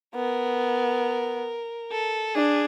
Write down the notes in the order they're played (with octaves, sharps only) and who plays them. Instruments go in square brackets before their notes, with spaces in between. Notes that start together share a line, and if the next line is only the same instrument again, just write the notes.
[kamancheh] B3 [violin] A#4
[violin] A4
[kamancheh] D4 [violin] G#4